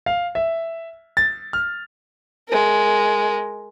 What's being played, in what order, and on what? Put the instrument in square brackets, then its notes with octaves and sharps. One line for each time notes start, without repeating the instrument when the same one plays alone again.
[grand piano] F5
E5
A6
F6
[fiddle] G#3 A#4